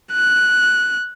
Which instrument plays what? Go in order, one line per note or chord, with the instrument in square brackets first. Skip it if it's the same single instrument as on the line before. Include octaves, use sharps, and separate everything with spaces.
[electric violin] F#6